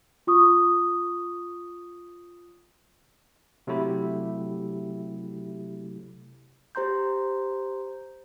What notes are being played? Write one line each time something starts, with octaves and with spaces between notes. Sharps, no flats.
F4 C#6 D#6
C3 F#3 A3 E4 G4
G4 C5 A#5 C6 G6